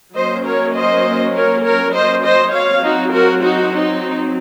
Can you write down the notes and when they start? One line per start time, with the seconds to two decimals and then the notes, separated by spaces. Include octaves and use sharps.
0.15 F#3 A#3 C#4 C5 D#5
0.45 A#4 C#5
0.75 C5 D#5
1.35 A#4 C#5
1.65 A#4 C#5
1.93 C5 D#5
2.24 C5 D#5
2.53 F#3 C4 C#5 F5
2.83 D#4 F#4
3.13 F#4 A#4
3.42 D#4 F#4
3.72 D#4